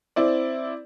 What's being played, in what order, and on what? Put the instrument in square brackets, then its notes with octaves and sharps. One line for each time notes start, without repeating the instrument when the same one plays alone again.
[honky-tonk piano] C4 E4 D5